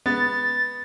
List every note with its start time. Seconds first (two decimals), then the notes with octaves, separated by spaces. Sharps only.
0.06 G#3 B3 A6